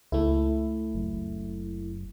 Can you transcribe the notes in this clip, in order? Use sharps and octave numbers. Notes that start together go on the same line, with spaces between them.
C#2 A3 E4
F#1